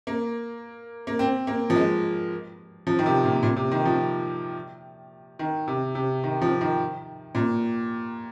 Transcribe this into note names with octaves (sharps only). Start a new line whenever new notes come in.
A#3
A#3
C4
A#3
F3
G#3
F3
D#3
C3
A#2
A#2
C3
D#3
F3
D#3
C3
C3
D#3
F3
D#3
A#2